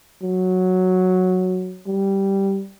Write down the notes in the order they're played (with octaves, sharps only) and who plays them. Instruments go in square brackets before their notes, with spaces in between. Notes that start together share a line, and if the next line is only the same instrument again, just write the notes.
[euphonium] F#3
G3